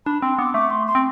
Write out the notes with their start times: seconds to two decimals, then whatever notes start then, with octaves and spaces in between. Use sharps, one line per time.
0.06 D4 B5
0.22 C4 C6
0.39 B3 D6
0.54 A3 D6
0.70 C6
0.87 C6
0.95 C4